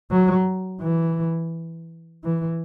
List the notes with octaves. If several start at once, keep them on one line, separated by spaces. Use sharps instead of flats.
F#3
E3
E3